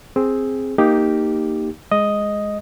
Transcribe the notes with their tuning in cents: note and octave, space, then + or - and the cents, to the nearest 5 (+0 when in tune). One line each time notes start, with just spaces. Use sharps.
C4 +5 G#4 +0
A#3 -5 D#4 +0 G4 +0
G#3 +0 D#5 +0